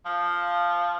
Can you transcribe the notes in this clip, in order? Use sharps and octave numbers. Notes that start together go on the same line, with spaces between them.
F3